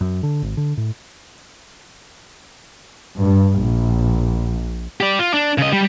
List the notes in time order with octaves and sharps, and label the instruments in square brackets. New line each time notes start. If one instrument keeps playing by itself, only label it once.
[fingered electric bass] F#2
D3
G#1
D3
A2
[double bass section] G2
A#1
[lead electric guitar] G4 D5
F4
D4
C#3 D#5
G3